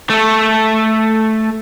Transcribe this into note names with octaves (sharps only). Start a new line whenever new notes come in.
A3 A4